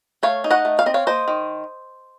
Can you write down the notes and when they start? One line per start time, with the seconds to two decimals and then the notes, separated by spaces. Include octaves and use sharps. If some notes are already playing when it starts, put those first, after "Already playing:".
0.23 A3 C#5 F5
0.44 D#4
0.51 D#5 F#5
0.65 A3
0.79 F5
0.86 C4 D#5
0.94 C#5 F5
1.07 A#3 C5 D#5
1.28 D#3